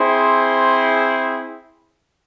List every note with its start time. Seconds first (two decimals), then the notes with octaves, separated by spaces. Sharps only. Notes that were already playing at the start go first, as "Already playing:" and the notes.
Already playing: C4 E4 G#4 C5